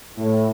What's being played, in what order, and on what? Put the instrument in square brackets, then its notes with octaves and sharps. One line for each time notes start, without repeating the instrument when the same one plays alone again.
[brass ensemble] A2